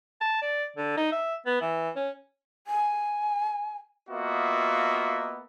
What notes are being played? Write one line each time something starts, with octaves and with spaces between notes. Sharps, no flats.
A5
D5
D3
D#4
E5
B3
E3
C#4
G#5
A#3 B3 F4 F#4 D#5 E5